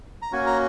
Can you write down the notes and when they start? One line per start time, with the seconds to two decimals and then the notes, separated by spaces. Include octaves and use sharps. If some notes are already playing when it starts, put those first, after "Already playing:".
0.22 A#5
0.32 A#3 C#4 F#4 G#5
0.47 A#5